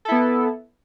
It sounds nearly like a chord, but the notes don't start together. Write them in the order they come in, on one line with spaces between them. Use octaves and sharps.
A4 E4 B3